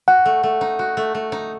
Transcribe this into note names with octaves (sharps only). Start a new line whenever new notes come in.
F#4 F#5
A3
A3
D#4
F#4
A3
A3
D#4